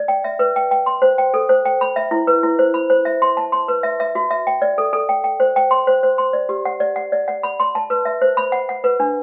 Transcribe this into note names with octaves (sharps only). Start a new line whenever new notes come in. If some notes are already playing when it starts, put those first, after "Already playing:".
Already playing: D5
G5
E5
B4
G5
G5
C6
C5
G5
A4
C5
G5
B5
E5
E4
B4
E4
C5
B5
C5
E5
C6
A5
C6
B4
E5
E5
F#4
E5
G5
D5
A4
A4
G5
G5
C5
G5
C6
C5
C5
C6
D5
G4
F#5
D5
F#5
D5
F#5
B5
C6
A5
B4
E5
C5
B5
F#5
F#5
B4
D4